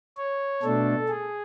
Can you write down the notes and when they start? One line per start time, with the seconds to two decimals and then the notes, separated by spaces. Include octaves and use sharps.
0.17 C#5
0.62 B2 A3 D4 A4
1.09 G#4